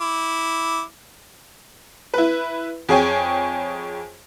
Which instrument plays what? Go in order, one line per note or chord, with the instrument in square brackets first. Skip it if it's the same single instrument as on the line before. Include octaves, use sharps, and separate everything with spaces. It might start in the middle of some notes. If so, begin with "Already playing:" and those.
[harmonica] E4 D6
[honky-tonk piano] E4 B4
F2 G#4 C#5 G5 G#5